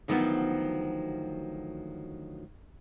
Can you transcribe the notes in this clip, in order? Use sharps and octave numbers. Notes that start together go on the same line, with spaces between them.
D2 D#3 F3 F#3 B3